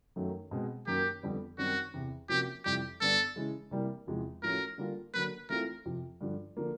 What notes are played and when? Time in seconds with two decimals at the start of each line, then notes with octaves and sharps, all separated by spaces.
0.16 F#2 D#3 F#3 A3
0.51 B2 G#3 C4
0.87 F#2 D#3 F#3 A#3 G4
1.23 F2 D3 G3 B3
1.58 F#2 D#3 G3 C4 F#4
1.94 E2 C3 E3
2.29 C3 F3 A#3 C#4 F#4 G4
2.65 F2 C3 E3 G3 G4
3.01 G2 D3 G3 B3 D4 A4
3.36 C#3 E3 G#3
3.71 C3 E3 G3 A#3
4.07 E2 C3 F3 G#3
4.43 A2 F3 A3 C#4 F#4 A#4
4.78 D3 G3 A#3 D4 F4
5.14 D3 F#3 A#3 B4
5.49 E3 A3 C4 F4 A#4
5.85 F2 C3 F3
6.21 G2 D3 F3
6.57 D3 F3 A#3